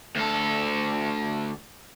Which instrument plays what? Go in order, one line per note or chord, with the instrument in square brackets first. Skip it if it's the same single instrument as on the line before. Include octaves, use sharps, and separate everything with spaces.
[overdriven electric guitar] D2 A4